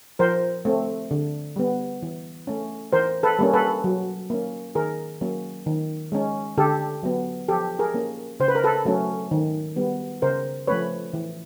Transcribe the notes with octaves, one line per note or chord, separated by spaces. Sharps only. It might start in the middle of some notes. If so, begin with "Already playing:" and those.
F3 A#4 C5
A3 C4
D3
G3 B3
E3
A3 C#4
E3 A#4 C5
A4 B4
G3 A#3 C#4
A4 B4
F#3
A#3 C#4
D#3 G#4 A#4
F#3 A#3 C#4
D#3
G#3 C#4
D3 G4 A4
F#3 B3
F3 G4 A4
G#4 A#4
A#3 C#4
C#3 C5
B4
A#4
A4 B4
F#3 A3 C#4
D#3
G3 B3
C#3 A#4 C5
F3 A3 C#4 B4 C#5
E3